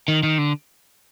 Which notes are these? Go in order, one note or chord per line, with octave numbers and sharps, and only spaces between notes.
D#3
D#3
D3